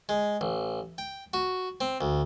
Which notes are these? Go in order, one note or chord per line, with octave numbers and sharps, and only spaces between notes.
G#3
A1
G5
F#4
C4
D2